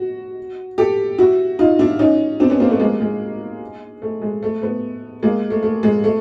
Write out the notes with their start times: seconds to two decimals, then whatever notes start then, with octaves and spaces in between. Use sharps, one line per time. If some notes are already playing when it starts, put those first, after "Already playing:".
Already playing: F#4
0.78 G4 A4
1.18 E4 F#4
1.59 D#4 F4
1.79 D4 E4
1.99 C#4 D#4
2.40 C4 D4
2.50 B3 C#4
2.60 A#3 C4
2.70 A3 B3
2.80 G#3 A#3
3.01 G#3
4.02 A3
4.22 G#3
4.43 A3
4.62 A3 B3
5.23 G#3 A#3
5.50 A3
5.63 A3
5.83 G#3
6.04 A3